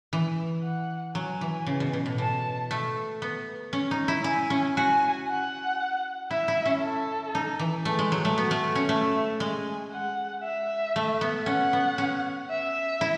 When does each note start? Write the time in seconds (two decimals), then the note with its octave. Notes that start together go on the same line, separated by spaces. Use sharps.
0.13 E3
0.63 F#5
1.15 F#3 G#5
1.41 E3
1.67 C#3
1.80 B2
1.93 B2
2.06 A2
2.18 B2 A5
2.71 A3
3.22 B3
3.73 C#4
3.91 D#4
4.08 E4
4.24 E4 G#5
4.50 C#4
4.76 F#4 G#5
5.29 F#5
6.31 E4 E5
6.48 E4
6.65 C#4
6.83 A4
7.35 D#4
7.59 E3
7.85 A3 G#4
7.99 G#3
8.12 F#3
8.25 A3
8.37 B3 F#4
8.51 A3
8.75 C#4
8.89 A3 E5
9.40 G#3 G#5
9.92 F#5
10.44 E5
10.96 A3
11.21 B3
11.46 C#4 F#5
11.73 B3
11.98 C#4
12.50 E5
13.01 E4